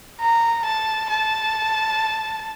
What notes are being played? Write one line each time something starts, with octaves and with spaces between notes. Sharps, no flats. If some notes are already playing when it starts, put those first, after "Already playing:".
A#5
A5
A5